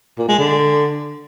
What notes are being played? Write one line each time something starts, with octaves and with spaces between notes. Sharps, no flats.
A#2
G#3
D3